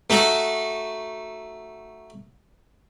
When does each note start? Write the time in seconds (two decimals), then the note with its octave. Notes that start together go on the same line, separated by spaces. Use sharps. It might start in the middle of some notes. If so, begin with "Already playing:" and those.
0.10 A3 D#4 F#4 A4